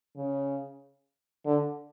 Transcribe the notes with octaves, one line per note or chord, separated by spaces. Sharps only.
C#3
D3